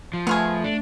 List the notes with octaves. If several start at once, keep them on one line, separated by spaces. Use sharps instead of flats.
F3
A3 B3 F4 G#4
D4